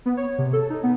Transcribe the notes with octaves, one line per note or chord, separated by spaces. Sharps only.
B3
C#5
C3
A4
D#4
B3